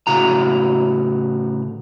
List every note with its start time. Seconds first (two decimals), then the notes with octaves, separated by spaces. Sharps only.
0.07 A2 C#3 F#4 A#5